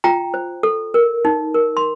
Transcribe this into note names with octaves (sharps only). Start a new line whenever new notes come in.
F4 G5 A#5
C5
A4
A#4
D#4
A#4
C6